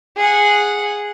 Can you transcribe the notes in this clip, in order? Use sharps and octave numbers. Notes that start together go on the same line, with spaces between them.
G#4 F#5